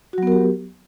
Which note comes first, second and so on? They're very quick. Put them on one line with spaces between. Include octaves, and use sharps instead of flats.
F#4 F#3 B3 A#4 G4